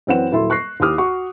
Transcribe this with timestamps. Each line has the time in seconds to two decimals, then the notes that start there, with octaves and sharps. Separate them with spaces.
0.07 F#2 E3 C4 B4 F#5 E7
0.31 D#1 F#3 E4 A4 E5 C6
0.50 C#6 F#6 A#6 C7
0.80 D#2 E4 G4 D6 D#6 F6
0.98 F#4 F#5 C#6